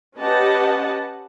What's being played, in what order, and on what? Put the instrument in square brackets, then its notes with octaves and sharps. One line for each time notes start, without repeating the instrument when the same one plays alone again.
[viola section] C#4 G4 B4 D#5 F#5 A5